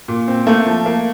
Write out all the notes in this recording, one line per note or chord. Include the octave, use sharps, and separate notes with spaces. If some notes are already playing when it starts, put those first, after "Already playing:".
A#2
C4
A3 A#3
F3
A#3